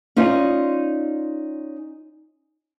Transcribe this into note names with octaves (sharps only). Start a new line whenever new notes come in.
C#4 D#4 F4 D5 D#5